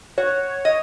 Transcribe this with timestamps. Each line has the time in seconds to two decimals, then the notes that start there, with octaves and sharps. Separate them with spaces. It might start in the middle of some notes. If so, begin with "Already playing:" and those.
0.18 F#4 C#5
0.65 D#5